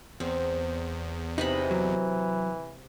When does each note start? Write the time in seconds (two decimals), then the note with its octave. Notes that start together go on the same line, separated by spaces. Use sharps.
0.20 E2 C4
1.38 C3 E3 D#4 D#5 B5
1.71 F#3